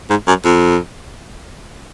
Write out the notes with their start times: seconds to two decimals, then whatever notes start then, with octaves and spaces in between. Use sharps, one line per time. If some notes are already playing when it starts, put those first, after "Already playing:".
0.10 G#2
0.28 F#2
0.45 F2